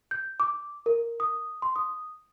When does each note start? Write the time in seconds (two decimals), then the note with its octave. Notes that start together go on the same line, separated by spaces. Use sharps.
0.11 G6
0.40 D6
0.86 A#4
1.20 D#6
1.62 C6
1.76 D#6